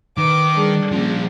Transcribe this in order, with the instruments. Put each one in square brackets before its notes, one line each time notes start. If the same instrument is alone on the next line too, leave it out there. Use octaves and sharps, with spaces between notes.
[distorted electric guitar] D#3 [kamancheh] B4 D6
[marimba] G3 G#4 [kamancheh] D4
[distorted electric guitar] F3 A#3 [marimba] C#4